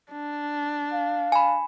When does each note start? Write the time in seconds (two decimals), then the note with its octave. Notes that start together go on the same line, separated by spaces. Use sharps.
0.12 D4
0.93 F5
1.32 G#5 B5